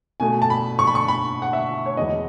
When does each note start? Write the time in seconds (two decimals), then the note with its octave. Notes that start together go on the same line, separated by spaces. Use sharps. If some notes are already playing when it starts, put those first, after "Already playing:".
0.20 B2 A3 G#5
0.42 A5
0.50 B5
0.79 C#6
0.87 B5
0.95 C#6
1.08 B5
1.42 F#5
1.53 E5
1.86 C#5
1.97 E2 B2 G#3 B3 D#5